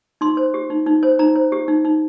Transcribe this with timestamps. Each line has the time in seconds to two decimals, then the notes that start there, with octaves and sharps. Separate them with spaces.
0.21 D#4 C6
0.37 C5
0.54 G4
0.70 D#4
0.86 D#4
1.03 C5
1.19 D#4 A#5
1.35 C5
1.52 G4
1.68 D#4
1.85 D#4